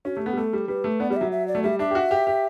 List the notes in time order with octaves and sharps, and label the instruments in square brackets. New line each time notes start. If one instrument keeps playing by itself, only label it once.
[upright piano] C#4 [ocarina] F#4
[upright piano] A3 [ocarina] G4
[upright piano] B3 [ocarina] A4
[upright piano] G3
[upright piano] A3 [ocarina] A4
[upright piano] G3
[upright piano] G3 [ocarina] B4
[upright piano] A3
[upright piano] B3 [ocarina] D5
[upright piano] G3 [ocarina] D5
[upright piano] F#3 [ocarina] E5
[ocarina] E5
D5
[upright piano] A3
[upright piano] G3 [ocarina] E5
[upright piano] D4 [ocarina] E5
[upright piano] G4
F#4
G4
G4